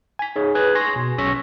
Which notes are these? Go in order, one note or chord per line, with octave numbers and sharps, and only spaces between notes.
G#5 B6
D#4 G#4 C#5
G#4 B4 F#6 G#6
G#5 C6 C#6 A#6
B2
B1 C#4 C#6 E6 A#6 B6